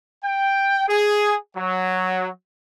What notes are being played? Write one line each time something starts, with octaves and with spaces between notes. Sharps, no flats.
G5
G#4
F#3